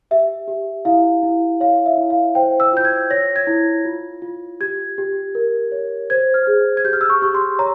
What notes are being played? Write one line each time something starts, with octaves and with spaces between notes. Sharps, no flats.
G4 E5
G4
E4 F5
E4
C#5 F5
E5
E4
F5
C5 G5
E6
F4 G6
G#6
C#5 A#6
G#6
E4
F4
F4
G4 G#6
G4
A#4
C#5
C5 G#6
F6
G#4
G#6
G4 G6
F6
E6
C#6
G4 C#6
C6
C#5 A#5